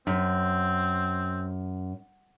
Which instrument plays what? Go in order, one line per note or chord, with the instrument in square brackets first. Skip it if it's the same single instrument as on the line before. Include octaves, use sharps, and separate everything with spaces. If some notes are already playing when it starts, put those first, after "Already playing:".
[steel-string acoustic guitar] F#2 [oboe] C4